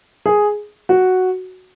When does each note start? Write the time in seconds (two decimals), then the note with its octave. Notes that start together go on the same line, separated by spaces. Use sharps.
0.26 G#4
0.89 F#4